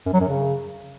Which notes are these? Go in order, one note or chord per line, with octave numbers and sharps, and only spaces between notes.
F#2
F#3
F#2
C#3